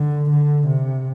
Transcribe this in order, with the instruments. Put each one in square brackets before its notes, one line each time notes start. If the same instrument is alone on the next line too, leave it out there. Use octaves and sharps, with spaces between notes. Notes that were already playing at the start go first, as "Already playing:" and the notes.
Already playing: [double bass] D3
D3
C3